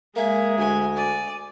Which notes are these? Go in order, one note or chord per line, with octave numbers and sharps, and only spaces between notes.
G#3 A#3 E5 G#5
D2 G#5
D5 G#5